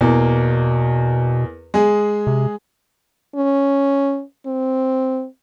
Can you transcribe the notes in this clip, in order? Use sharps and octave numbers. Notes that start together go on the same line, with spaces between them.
E2 B2 A#3
G#3 G#4
C3
C#4
C4